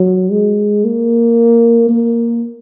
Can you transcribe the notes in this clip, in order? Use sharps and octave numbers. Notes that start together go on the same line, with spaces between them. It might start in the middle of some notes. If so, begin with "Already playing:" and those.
Already playing: F#3
G#3
A#3
A#3